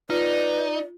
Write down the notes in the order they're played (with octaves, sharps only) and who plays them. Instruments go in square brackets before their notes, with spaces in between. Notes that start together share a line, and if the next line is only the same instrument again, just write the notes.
[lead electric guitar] D#4 [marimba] F4 [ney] B4 [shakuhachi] D5